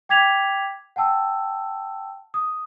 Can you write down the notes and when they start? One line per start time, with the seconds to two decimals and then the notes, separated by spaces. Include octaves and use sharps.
0.09 G5 D6 G#6 B6 F7
0.96 F#5 G5 A5 E6
2.34 D#6